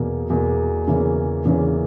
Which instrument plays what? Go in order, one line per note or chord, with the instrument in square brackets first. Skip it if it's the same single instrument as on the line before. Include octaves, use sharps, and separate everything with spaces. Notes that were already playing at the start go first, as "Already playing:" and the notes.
Already playing: [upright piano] E2 B2 A#3
E2 B2 A#3
E2 C#3 E3 A#3 C#4
E2 C#3 E3 A#3 C#4